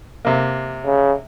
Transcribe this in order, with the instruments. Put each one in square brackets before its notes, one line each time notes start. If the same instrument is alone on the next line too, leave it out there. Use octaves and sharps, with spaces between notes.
[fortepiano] C3 A#3
[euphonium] C#3